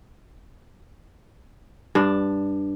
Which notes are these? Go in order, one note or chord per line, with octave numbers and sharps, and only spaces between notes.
G2 D4